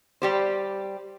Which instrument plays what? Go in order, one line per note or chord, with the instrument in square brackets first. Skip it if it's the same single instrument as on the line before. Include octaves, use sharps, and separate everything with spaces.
[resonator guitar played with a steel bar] G3 G4 C5